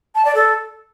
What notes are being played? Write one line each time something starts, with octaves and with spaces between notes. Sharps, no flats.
A5
D5
A4